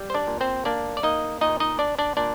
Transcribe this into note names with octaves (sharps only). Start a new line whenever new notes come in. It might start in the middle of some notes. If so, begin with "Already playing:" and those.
Already playing: G3
C5
D4 D5
A#2
C4 C5
A#3 D4 D5
D5
A#3 D#4 D#5
A#2 D#4 D#5
D#4 D#5
D4 D5
D4 D5
A#2 D4 D5